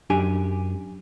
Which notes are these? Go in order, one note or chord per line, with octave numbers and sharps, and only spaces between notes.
F#2 D4 G4 G#5